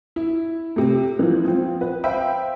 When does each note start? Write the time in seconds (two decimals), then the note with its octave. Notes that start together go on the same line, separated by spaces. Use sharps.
0.16 E4
0.76 C3 A3
1.19 E3 F3
1.45 F3 C4
1.81 B4
2.04 C5 E5 F5 G5 B5